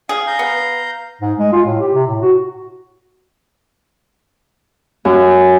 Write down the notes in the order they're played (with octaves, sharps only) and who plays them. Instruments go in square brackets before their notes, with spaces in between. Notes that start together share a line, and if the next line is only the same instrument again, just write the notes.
[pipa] G#4 [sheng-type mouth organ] F5
[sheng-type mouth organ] F5 A#5 G6
[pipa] B3
[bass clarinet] G#2
G#3
F4
A2
G4
C3
A2
F#4
[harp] F#2